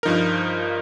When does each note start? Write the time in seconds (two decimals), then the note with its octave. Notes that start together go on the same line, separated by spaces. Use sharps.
0.03 G2 F3 D#4 A#4